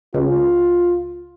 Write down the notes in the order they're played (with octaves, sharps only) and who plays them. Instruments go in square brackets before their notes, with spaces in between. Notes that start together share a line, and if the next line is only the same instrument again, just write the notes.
[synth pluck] C#2 [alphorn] F4